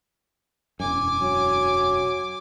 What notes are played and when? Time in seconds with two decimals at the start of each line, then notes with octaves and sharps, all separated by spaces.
0.80 E1 F#2 G#5 D6
1.22 F#3